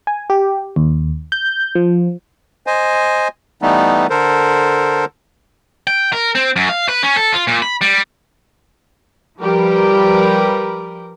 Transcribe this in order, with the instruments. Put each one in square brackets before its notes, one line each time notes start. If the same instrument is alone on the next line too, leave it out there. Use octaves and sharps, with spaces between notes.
[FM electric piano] G#5
G4
D#2
G6
F3
[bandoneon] C5 D#5 G#5
E3 G3 A3 B3 D#4
D3 A4 A#4 C5
[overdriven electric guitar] G5
A#4
C4
F#2
F5
B4
C#4
A4
F4
A#2
B5
G3
[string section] F3 G3 G4 A#4 B4